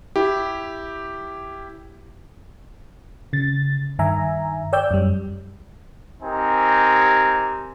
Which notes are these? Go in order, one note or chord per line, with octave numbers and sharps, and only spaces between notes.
E4 G4
C#3 A6
G2 D#3 E5 G#5 A#5
C#5 D5 G5 E6 G6
F#2 G3
C4 D#4 G4 A#4 G#5